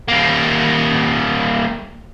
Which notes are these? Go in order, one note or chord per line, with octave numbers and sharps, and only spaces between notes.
G3 A#3